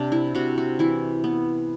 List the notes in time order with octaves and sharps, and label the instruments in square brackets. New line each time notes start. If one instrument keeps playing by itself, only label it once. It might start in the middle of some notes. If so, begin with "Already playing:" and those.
Already playing: [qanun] C3 D4
E4
C3 F#4
F#4
E3 E4
B3